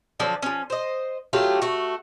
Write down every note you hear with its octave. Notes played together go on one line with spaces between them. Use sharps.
D3 F3 F#3 D4
F3 C#4
C5 D#5
F#3 A3 F4 G4
A3 F#4